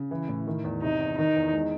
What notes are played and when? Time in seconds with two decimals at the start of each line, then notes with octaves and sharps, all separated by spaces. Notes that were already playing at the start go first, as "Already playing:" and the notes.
Already playing: C#3
0.11 E3
0.28 A2
0.47 D#3
0.64 E2
0.82 C3 D#4
1.00 E2
1.18 D#3 D#4
1.36 E2
1.53 G#3